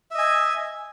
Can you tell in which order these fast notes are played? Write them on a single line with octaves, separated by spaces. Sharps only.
E5 D#5 G#5